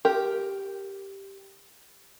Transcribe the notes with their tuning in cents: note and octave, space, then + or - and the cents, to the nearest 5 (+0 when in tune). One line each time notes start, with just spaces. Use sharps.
G4 +0 A#4 +0